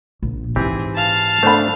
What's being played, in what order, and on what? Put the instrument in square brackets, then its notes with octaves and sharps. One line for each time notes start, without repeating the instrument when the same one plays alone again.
[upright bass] A#1
[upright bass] G#2 D#4 [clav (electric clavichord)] E3 C4 G4 [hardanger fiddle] G#4
[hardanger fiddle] F5 A5
[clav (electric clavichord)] A3 D4 [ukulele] C5 B5